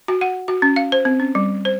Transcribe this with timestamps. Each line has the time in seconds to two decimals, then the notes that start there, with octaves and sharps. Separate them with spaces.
0.08 F#4
0.21 F#5
0.48 F#4
0.62 C#4
0.76 F5
0.92 C5
1.05 C4
1.20 C#4
1.35 G3
1.65 C5